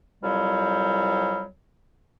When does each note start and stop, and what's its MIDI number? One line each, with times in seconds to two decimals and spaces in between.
0.23 1.44 36
0.23 1.44 41
0.23 1.44 54
0.23 1.44 55